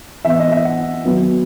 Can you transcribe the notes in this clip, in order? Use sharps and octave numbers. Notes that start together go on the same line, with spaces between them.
E3 B3 E5
D#5
E5
F#5
D#3 F#3 B3